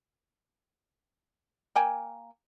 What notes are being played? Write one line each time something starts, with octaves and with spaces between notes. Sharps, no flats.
A#3 G5 G#5